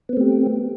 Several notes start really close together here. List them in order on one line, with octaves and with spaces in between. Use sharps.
B3 C4 A3 G4